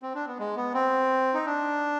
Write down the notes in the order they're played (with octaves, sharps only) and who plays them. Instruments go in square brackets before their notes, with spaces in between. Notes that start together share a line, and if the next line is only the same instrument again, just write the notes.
[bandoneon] C4
D4
B3
G#3
B3
C4
D#4
D4